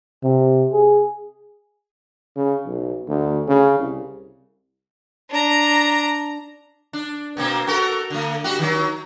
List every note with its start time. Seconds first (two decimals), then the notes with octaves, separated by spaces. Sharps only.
0.24 C3
0.73 G#4
2.36 C#3
2.66 B1
3.08 D2
3.48 C#3
3.78 C2
5.30 D4 A#5
6.93 D4
7.37 B2 A#3 C4
7.67 F#4 A4 A#4
8.10 D3 A3
8.44 G3 F#4
8.59 D#3 F#3